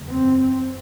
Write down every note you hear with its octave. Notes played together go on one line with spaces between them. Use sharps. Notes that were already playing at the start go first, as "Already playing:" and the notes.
Already playing: F#1 E2 C#3
C4